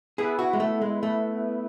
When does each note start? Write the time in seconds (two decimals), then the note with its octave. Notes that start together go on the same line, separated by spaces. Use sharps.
0.18 B3 E4 G#4 B4
0.39 F#4
0.53 G#3
0.60 A3
0.82 G#3
1.03 A3